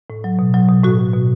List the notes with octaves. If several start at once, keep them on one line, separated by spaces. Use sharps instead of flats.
A2
F#3
B2
F#3
B2
A2 F#4
A2
B2